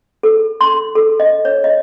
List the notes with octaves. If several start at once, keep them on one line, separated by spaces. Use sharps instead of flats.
A4
C6
A4
D#5
C#5
D#5